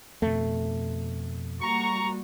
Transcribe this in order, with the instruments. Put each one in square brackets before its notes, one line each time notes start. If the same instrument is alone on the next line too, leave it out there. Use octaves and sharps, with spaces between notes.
[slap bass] F2 B2 [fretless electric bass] A3
[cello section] G3 A#3 F#4 [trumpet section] A#5 C#6